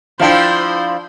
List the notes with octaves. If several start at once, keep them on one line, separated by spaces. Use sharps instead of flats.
F3 D4 E4 F4 C5 F5 G5